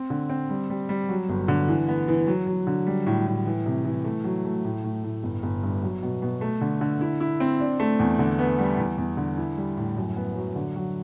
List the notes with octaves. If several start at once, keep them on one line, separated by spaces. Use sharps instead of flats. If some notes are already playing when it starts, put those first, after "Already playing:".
Already playing: C4
D3
C4
G3
G3
G3
F#3
G1
D3
E3
B3
E3
F#3
F#3
D3
G3
A2
A2
E3
C3
E3
A3
F#3
A3
A2
A2
A2
G1
G1
G2
F#3
B2
B2
A3
D3
D3
E4
E4
C4
D4
A3
E2
D3
B3
G3
E2
E2
D3
E4
G3
A2
F#2
B3
F#3
D3
F#3